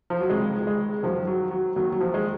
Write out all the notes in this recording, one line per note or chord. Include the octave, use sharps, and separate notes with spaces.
F3
F#3
C#2 C3 D#3 G#3
G#3
F#2 D#3 F3
F#3
F#3
D#2 D#3 F#3
F#3
F3
G#3